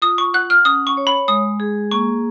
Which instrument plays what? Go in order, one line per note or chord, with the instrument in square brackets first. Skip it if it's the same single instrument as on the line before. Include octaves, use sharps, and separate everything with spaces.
[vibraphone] F4 [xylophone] D#6
[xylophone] C#6
[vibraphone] F#5 [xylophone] F#6
[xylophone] F6
[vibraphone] C#4 [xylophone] D#6
[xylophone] C#6
[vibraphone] C#5
[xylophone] B5
[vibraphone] G#3 [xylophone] D#6
[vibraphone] G#4
[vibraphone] A#3 [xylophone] C#6